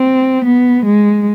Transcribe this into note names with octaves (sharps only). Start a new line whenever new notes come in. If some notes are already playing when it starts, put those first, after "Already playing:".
Already playing: C4
B3
G#3